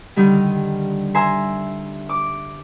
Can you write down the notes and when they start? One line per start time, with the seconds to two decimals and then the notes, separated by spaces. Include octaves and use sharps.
0.16 D3 D#3 G3
1.15 E5 G#5 A#5 C6
2.09 D6